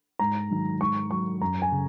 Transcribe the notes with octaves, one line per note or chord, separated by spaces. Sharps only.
G#2 A#5
D#3 F#3
G#2 C#6
F#3 C#6
F#2 A#5
G#5
C#3